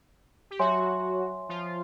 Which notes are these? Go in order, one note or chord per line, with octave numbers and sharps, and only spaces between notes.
G4
F#3 F#4 C#5 E5 G#5 C6
F3 F4